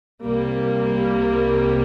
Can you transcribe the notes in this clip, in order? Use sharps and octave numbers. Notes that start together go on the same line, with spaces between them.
C2 C3 G3 A#3